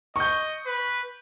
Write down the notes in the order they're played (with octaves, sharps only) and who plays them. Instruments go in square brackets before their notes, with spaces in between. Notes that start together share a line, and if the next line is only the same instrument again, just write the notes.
[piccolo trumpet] D#5 [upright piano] C#6 G6
[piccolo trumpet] B4